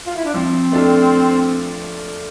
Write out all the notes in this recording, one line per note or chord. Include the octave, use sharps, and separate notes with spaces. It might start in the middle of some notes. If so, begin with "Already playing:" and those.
F4
E4
D4
F3 C4
A3 D4 F4 A4